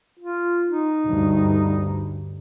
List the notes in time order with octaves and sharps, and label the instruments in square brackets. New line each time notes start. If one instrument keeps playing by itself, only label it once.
[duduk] F4
D#4
[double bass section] D2 G2